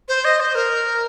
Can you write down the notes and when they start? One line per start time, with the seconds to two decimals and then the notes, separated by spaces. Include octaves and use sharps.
0.08 C5
0.25 D#5
0.40 C5
0.55 A#4